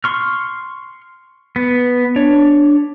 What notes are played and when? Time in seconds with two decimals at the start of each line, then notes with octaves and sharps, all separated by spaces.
0.04 C6 C#6 F6
1.56 B3
2.16 D4 C#5